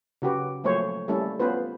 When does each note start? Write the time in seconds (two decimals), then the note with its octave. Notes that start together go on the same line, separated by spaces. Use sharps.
0.22 C#3 F#4 G4 B4
0.64 F3 F#3 A3 A#3 C5 C#5
1.08 G3 A3 A#3 C#4 E4 A4
1.39 B3 C#4 F4 B4 C5